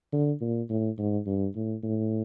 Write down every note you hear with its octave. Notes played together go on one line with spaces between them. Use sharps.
D3
A#2
A2
G#2
G2
A2
A2